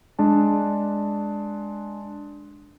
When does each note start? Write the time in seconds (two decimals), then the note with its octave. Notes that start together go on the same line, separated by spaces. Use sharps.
0.19 G#3 D4 A5